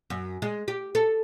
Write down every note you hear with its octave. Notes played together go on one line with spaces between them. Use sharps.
F#2
G#3
G4
A4